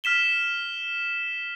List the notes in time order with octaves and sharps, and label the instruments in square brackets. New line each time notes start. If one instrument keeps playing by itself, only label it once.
[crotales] F6 B6 E7 G7